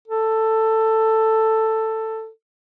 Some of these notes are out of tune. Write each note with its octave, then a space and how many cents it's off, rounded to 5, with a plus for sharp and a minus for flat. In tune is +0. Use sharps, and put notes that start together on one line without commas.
A4 +10